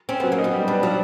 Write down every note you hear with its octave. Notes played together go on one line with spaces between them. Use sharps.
C4 C#4
F#3 B3
A#3
D#4
B3
G3
B3 D4
F3 F#3